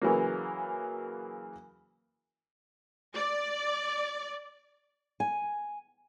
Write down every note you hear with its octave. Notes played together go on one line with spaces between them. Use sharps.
C#3 E3 F#3 A#3
D5
G#5